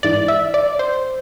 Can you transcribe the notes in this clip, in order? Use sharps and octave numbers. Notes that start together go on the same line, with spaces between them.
G#2 E3 D5
E5
D5
C5